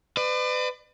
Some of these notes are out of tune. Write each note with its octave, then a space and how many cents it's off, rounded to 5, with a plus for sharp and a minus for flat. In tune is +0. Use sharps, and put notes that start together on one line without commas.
B4 +35 D5 +40